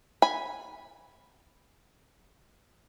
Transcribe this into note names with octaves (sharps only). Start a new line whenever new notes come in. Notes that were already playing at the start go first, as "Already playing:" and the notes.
G#5 B5